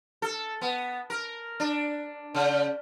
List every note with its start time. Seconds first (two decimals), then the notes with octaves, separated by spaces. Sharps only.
0.22 A4
0.61 B3
1.10 A#4
1.60 D4
2.35 C#3